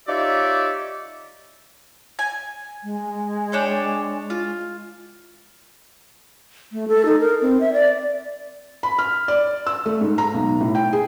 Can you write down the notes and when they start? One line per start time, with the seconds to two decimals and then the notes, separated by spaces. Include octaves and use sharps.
0.08 D#4 F4 G4 C#5 D5 E5
2.19 G#5
2.84 G#3
3.52 D4 C#5 G5
4.30 F4
6.72 A3
6.88 A4
7.05 D#4
7.20 A#4
7.41 C4
7.60 E5
7.73 D5
8.83 B5
8.99 F6
9.28 D5
9.67 E6
9.86 A3
10.01 G#2
10.18 A#5
10.34 B1
10.61 A2
10.75 G5
10.93 G#4